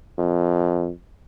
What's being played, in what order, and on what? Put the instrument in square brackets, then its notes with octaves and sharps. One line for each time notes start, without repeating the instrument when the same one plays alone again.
[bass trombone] F2